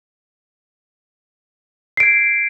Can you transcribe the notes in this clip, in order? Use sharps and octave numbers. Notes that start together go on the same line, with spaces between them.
G#6 C7 D7